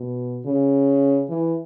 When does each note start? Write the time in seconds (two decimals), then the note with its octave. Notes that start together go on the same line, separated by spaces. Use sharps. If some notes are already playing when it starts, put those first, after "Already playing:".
Already playing: B2
0.46 C#3
1.29 E3